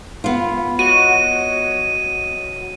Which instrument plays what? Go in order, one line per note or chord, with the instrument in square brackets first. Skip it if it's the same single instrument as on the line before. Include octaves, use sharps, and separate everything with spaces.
[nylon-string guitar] B3 F4
[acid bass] F#4 [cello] C#5 D#5 [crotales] D#7